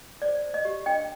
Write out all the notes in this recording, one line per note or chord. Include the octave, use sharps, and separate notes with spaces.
C5 D5
C5
D#5
G4
D4 D#5 G5